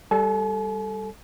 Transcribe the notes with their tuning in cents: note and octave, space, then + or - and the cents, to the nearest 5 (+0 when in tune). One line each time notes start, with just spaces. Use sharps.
G3 +0 A4 +0 G#5 +45